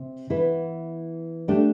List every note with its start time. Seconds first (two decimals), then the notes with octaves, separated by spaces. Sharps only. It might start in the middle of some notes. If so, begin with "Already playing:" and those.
Already playing: C3
0.30 E3 B3 E4 B4
1.48 A3 D4 G4